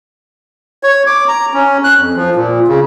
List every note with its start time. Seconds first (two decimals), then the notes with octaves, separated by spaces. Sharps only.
0.83 C#5
1.07 D6
1.28 A#5
1.54 C#4
1.84 F#6
1.97 F2
2.16 F3
2.35 A#2
2.68 C#3